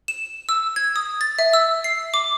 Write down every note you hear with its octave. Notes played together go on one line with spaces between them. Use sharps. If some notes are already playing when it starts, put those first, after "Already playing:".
E7
E6
G#6
D#6
A6
E5
E6
C7
D6